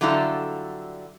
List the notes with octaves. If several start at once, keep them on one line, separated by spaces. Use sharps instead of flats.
D3 F#3 G3 E4 F4 A4